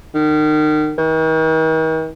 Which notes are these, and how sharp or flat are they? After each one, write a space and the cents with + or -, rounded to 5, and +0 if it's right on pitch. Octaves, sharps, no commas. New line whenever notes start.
D#3 -30
D#3 +45